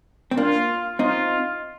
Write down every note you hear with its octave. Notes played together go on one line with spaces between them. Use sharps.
C4
A#3 D4 F4
C4 D#4 F4